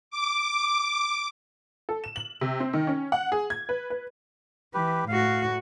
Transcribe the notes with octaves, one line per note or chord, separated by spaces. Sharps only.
D6
A4
E7
F#7
C3
C4
D#3
C#4
F#5
G#4
G#6
B4
B4
E3 G4 B4
A2 F#4 F5